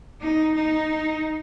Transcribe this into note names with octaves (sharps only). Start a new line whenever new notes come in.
D#4
D#4